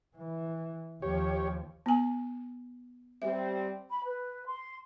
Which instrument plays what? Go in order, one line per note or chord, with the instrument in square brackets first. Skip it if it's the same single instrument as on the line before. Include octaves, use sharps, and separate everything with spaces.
[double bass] E3
[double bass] D#2 F3 [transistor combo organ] G4 C#5
[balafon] B3 G#5
[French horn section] G3 C4 [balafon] E5
[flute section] B5
B4
C6